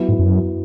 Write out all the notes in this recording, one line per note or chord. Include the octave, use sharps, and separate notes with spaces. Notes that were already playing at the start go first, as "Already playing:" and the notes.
Already playing: F#3 B3 E4
G#2
F#2